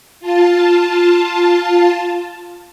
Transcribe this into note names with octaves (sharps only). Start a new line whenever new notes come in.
F4 A5